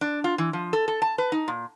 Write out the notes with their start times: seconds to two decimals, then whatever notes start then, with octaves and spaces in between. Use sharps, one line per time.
0.01 D4
0.24 F4
0.38 E3
0.53 F3
0.73 A4
0.88 A4
1.02 A5
1.18 B4
1.32 D#4
1.48 A#2